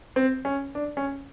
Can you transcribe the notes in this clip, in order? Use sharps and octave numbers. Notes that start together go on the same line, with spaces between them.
C4
C#4
D4
C#4